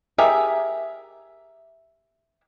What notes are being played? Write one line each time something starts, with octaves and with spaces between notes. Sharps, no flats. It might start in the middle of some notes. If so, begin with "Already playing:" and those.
G4 G#4 A#4 E5